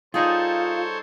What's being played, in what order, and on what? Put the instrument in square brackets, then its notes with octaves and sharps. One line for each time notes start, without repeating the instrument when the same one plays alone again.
[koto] G3 D#4 G#4 [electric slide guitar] F4 [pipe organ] A4 C5 C#5